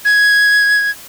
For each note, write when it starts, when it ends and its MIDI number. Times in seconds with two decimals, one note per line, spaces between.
0.05 0.91 92